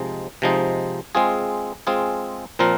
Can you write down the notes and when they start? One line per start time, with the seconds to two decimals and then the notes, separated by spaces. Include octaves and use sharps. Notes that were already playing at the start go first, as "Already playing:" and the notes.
Already playing: C3 F3 G#3 D#4
0.42 C3 F3 G#3 D#4
1.15 G#3 C4 F4 G#4
1.87 G#3 C4 F4 G#4
2.59 A#2 F3 C4 F4 A#4